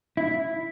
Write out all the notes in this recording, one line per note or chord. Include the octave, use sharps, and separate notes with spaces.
E4